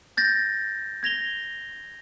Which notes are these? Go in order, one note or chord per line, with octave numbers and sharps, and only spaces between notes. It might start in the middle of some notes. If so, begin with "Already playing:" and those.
G6 A6 A#6
G#6 A#6 F7 G7